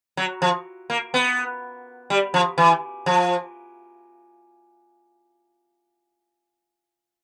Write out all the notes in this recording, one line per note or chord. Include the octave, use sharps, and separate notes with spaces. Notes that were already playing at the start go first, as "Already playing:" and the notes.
F#3
F3
A#3
B3
G3
F3
E3
F3